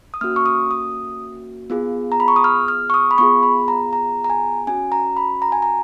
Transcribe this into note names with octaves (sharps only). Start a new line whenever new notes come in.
D#6
A#3 C#4 F#4 F6
C#6
D#6
D#6
B3 F4 G#4
A#5
B5
C#6
D#6
F6
F6
C#6
D#6
B5
B3 F4 G#4 C#6
B5
A#5
A#5
A#5
G#5
C#4 F#4 G#5
A#5
B5
A#5
G#5
A#5